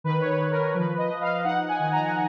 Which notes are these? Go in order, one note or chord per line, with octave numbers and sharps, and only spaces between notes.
D#3 B4
C#5
B4
D#3
A#4
F3 B4
D#5
F3
F5
D#4 F#5
G#5
D#3
A#5